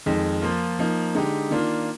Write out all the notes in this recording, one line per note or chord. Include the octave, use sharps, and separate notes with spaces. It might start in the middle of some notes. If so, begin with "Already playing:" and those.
F2 D#3 G#3
F3 A#3 F4
F3 A#3 D#4
D3 G#3 D#4 G4
D#3 A#3 D4 F4